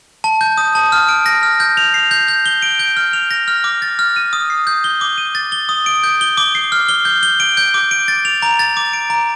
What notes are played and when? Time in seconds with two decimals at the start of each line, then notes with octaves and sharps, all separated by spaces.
0.24 A5
0.41 G6
0.58 D#6
0.75 A5
0.92 F6
1.09 D7
1.26 A#6
1.43 F6
1.60 G6
1.77 F7
1.94 C7
2.11 G6
2.28 G6
2.46 G7
2.62 D7
2.79 G6
2.97 F6
3.13 F7
3.31 A#6
3.48 F6
3.64 D6
3.82 A6
3.99 F6
4.16 D#7
4.33 D#6
4.50 C7
4.67 G6
4.84 G7
5.01 D6
5.18 D#7
5.35 A6
5.52 G7
5.69 D#6
5.86 D7
6.04 G6
6.21 G7
6.37 D6
6.55 C7
6.72 F6
6.89 G7
7.05 G6
7.23 G7
7.40 D7
7.57 G6
7.74 D6
7.91 D7
8.08 A6
8.25 F7
8.42 A#5
8.59 A6
8.77 D6
8.93 D7
9.10 A#5